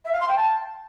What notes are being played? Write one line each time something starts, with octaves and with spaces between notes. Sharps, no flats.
E5
F5
C6
G5
A5